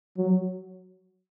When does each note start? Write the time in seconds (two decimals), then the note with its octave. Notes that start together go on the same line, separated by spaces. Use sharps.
0.18 F#3